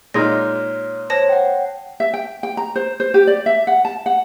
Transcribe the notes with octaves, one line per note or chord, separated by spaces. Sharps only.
A#2 G#3 D#4 C#5 F6 A#6
C5 C#5 A5 A#6
F#5 G5
E5
G5
G5
A#5
C5
C5
G4
D5
E5
F#5
A5
F#5